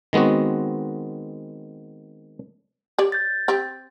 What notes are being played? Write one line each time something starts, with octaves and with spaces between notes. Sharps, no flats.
D#3 G#3 B3 C4 F#4
G4 C#5 D5
G6 A6
C4 G4